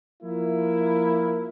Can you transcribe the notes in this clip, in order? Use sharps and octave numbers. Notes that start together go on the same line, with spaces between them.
F3 A#3 E4